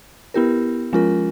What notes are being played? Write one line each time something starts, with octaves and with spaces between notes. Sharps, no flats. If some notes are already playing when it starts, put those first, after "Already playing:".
B3 E4 G4 A#4
F3 G#3 C#4 F4 A#4